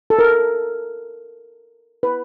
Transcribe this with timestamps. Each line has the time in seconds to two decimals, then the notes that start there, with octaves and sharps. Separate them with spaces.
0.10 A4
0.19 A#4
2.03 B4